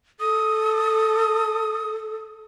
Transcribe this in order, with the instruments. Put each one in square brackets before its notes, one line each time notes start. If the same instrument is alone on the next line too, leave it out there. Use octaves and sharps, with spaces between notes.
[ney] A4 [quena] D#6